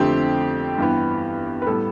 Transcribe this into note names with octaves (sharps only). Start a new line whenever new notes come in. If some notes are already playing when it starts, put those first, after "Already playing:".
Already playing: F2 D3 A3 C4 G4
G2 E3 B3
B4
A2 G3 B3 A4